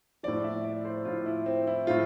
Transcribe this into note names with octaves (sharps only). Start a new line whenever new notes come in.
A2 F3 D5
E5
D5
C5
A2 F3 F4
E4
C4
E4
A2 F3 F4